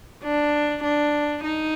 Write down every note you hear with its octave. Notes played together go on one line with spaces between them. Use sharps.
D4
D4
D#4